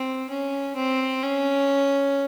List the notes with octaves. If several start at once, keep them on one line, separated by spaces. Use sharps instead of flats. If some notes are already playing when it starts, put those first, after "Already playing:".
Already playing: C4
C#4
C4
C#4